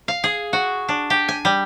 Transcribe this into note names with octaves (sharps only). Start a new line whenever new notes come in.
F5
G#4
F#4
D4
G4
G#5
G3